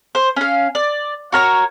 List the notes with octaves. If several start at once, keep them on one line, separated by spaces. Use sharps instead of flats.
C5
C#4 F5
D5
F#4 A#4 C#5